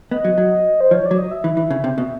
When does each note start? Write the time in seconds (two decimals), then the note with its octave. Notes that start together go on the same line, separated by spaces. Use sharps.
0.11 B3 D#5
0.24 F#3
0.38 F#3
0.81 C5
0.91 F3 C#5
1.06 D5
1.11 F#3
1.18 D#5
1.31 E5
1.44 E3
1.57 E3
1.70 C#3
1.84 C3
1.98 B2